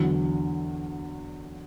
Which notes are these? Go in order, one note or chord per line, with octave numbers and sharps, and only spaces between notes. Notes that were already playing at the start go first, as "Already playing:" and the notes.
Already playing: E2 D3 F#3